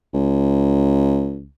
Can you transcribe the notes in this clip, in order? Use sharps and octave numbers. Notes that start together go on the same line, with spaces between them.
C#2